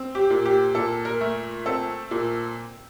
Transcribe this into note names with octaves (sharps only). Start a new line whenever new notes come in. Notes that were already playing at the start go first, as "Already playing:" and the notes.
Already playing: C4
G4
A#2
G4
A#2 A4
A#4
A3
C4 A4
A#2